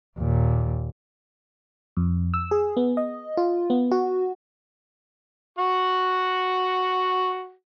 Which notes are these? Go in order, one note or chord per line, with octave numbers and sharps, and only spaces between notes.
D#2 A#2
F2
E6
G#4
B3
D#5
F4
B3
F#4
F#4 F#5